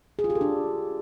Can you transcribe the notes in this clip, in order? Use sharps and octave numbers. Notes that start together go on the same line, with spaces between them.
G#4
F4
G4
A4
D4